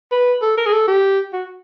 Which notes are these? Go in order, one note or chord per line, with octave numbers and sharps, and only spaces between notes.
B4
A4
A#4
G#4
A4
G4
F#4